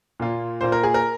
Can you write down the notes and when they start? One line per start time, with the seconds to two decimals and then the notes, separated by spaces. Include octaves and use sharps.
0.20 A#2 A#3 F4
0.61 A#2 A#3 F4 C5
0.72 A#4
0.83 G#4
0.94 A#4